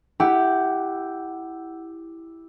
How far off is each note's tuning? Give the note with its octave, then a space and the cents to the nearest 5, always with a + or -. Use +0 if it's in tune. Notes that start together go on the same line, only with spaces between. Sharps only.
E4 +0 G4 +0 F#5 +20